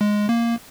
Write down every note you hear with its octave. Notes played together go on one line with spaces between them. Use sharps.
G#3
A#3